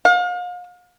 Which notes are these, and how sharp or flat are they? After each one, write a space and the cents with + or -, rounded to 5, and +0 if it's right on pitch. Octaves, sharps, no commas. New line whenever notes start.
F5 +40